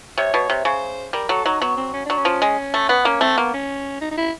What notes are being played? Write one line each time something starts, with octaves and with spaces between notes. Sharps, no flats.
C3 C#5
B2
C3
C#3 C5
G3 A#4
F#3 A4
F#3 D#4
F#3 B3
C4
C#4
F#3 D4
C#4
F3
G#3
A3
B3
A#3 C#4
A3 C4
A#3 B3
C#4
D#4
D#4
E4